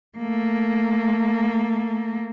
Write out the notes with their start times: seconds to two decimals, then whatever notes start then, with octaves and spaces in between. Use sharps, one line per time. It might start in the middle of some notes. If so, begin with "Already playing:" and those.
0.18 A3 A#3